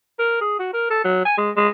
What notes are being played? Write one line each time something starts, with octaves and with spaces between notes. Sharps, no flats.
A#4
G#4
F#4
A#4
A4
F#3
G#5
G#3
G#3